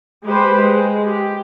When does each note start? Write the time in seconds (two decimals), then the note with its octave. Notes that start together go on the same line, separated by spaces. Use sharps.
0.24 G#3 G4 B4 C5
0.61 G#3
1.05 G4